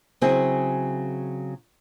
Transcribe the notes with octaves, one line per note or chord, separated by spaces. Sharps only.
C#3 F#3 C4 E4 G#4